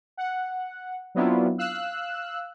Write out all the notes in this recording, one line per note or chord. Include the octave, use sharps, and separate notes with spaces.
F#5
F#3 B3 C4 D4 E4 F4
F5 E6 F#6